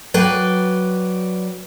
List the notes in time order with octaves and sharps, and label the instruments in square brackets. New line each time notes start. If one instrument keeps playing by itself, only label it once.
[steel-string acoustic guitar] F#3 B4 D5 G5